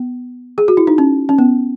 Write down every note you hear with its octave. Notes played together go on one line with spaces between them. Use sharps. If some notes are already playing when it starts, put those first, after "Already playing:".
Already playing: B3
G#4
F#4
E4
D#4
C#4
C#4
B3